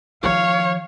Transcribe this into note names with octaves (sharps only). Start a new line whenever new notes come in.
D#3 F3 C#5 F5